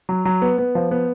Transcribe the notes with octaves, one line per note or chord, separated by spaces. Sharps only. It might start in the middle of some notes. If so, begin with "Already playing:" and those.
F#3
F#3
B3
B3
F3
B3